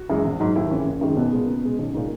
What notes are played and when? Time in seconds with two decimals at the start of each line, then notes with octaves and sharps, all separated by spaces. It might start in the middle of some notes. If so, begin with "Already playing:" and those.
Already playing: F#4
0.10 F#2 E3 G#3
0.25 A#1
0.40 G#2 F#3
0.55 D#2 E4
0.71 C#3 E3 C#4
0.86 F#1
1.01 F#2 D#3 G#3
1.17 B1 B3
1.33 A#2 G#3
1.47 C#2
1.63 B2 G#3
1.78 B1 C#4
1.94 A#2 G#3 D#4